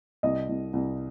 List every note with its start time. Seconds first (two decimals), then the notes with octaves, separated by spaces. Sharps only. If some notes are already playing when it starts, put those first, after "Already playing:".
0.23 C2 D#5
0.49 C2
0.73 C2